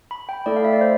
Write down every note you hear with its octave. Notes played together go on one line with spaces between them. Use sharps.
B5
G5
A3 E4 A4 D5
F5
E5
D5
C5